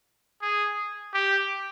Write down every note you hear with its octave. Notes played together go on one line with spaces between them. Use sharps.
G#4
G4